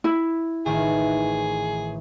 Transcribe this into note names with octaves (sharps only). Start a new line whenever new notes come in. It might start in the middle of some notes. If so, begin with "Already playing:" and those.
E4
A1 D#3 G#4